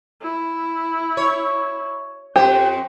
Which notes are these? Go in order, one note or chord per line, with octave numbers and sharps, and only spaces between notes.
E4
C#5
F2 G4 C5